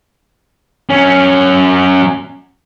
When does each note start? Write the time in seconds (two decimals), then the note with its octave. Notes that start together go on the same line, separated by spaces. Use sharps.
0.90 F#3 C#4